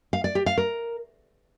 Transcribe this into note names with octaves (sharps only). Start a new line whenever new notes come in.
F5
D5
G4
F5
A#4